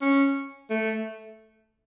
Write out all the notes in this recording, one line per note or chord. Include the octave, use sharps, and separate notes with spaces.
C#4
A3